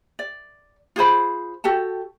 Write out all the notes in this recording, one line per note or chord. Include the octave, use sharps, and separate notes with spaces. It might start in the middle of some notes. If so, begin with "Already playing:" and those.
D5
F4 G#4 C5 B5
F#4 G4 A4 A5